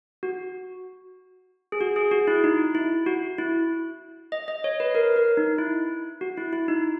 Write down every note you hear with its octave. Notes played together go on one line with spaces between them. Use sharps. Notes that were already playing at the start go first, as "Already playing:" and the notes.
F#4
G#4
F#4
G#4
F#4
E4
D#4
E4
F#4
E4
D#5
D#5
C#5
B4
A#4
A#4
D#4
E4
F#4
E4
E4
D#4